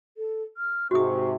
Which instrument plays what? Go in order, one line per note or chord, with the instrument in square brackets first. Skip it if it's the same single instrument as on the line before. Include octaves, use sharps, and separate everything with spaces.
[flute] A4
F6
[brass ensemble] G#2 C3 [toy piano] F#4 D#6 [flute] C#6